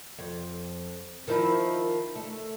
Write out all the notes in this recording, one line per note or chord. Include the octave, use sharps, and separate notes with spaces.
F2
D#3 F3 E4
A3